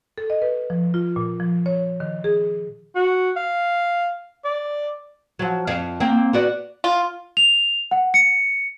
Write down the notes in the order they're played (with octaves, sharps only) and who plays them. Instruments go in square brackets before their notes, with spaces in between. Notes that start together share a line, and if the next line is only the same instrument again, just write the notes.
[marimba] A4
D#5
B4
F3
F4
A#2
F3
C#5
D#3
G#4
[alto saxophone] F#4
F5
D5
[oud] F3 F#3
F2 F5
A#3 C4
B3 F#4 D5
[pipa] F4
[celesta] F7
F#5
C#7